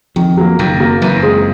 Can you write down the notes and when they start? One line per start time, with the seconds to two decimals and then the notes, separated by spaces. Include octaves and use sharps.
0.16 F2 D#3
0.37 F#3 A#3
0.59 F#1 F#2 D#3
0.80 F#3 A#3
1.01 F#1 F#2 E3
1.23 G#3 C4 F4 G#4